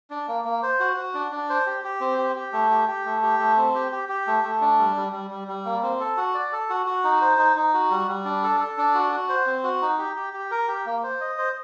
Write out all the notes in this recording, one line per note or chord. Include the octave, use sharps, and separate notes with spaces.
D4
A#3
A#3
C5
F#4
F#4
D4
D4
C5
G4
G4
C4
G4
G4
A3
G4
G4
A3
G4
A3
C4
G4
G4
G4
A3
A3
D4
G3
G3
G3
G3
G3
A#3
C4
A4
F#4
D5
A4
F#4
F#4
D#4
C5
D#4
D#4
F#4
G3
G3
D4
A4
A4
D4
F#4
F#4
C5
C4
F#4
D#4
G4
G4
G4
A#4
G4
A#3
C5
D#5
C5